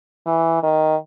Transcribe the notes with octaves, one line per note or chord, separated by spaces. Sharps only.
E3
D#3